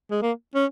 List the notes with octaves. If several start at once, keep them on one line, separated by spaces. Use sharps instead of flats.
G#3
A#3
C#4